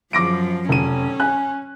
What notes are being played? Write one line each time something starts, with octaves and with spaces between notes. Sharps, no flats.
F#2 F3 D6 A#6 D7
F1 C#4 D#7
G#5 F#6